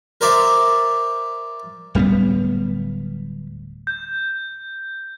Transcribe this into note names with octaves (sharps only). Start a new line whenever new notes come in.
A#4 C5 D5 E5
D1 G3 A#3 B3
G6